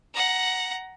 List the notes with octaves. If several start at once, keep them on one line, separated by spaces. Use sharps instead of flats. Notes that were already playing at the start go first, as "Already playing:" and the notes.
F#5 A#5